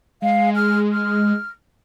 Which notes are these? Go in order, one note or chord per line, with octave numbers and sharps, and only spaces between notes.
G#3 F5
F6
F6